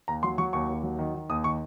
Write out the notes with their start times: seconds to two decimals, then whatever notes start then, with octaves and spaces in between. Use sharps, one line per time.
0.08 D#2 A#5
0.23 F#3 C6
0.38 F#3 C#6
0.53 D#2 C#6
0.69 D#2
0.83 F#3
0.99 D#3
1.14 D#3
1.29 D#2 D#6
1.44 D#3 C#6